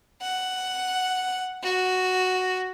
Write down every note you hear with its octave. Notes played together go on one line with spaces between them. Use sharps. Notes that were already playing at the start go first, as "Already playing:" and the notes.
F#5
F#4